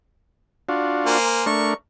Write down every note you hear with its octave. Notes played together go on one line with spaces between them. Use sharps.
D4 F4 F#4
A#3 C5 G#5
A3 D4 A#4 C#6